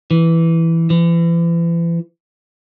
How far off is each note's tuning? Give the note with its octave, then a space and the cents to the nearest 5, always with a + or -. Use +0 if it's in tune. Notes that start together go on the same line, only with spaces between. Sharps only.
E3 +0
E3 +35